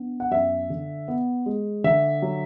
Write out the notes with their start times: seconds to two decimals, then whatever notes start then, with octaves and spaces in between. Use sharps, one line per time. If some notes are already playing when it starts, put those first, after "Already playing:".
Already playing: B3 D4
0.20 F#5
0.31 F#2 E5
0.70 D3
1.08 B3
1.46 G#3
1.84 D3 E5
2.22 F#3